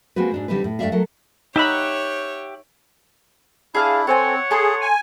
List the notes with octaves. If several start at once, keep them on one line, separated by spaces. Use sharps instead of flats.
G#3 A#3 C4 F#4 B4
G#2 D4 F#4
D3 G3 C4 D#4 B4
A2
G2 A3 G4 D5 E5 F5
F#3 A3 A4 A#4
D#4 G4 C#5 E5 F#5 B5
D4 E4 G#4 F5 A5
C4 A4 C5 C#5 F#5 G#5
G#4 A4 A5 C6
G#5